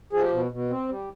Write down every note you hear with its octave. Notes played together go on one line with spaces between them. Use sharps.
F3 G#4
G4
B2
B2
C4
G3